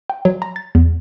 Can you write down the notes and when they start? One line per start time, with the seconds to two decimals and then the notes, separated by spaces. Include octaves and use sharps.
0.10 G5
0.25 F#3
0.42 A#5
0.56 A6
0.75 E2